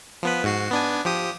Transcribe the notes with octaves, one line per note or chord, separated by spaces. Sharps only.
F3 B3 B4
G#2 F#4 C7
B3 D4 G#5
F3 G4 D#6